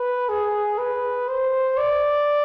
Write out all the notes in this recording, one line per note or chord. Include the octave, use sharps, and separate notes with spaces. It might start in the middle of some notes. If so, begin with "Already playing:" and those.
Already playing: B4
G#4
B4
C5
D5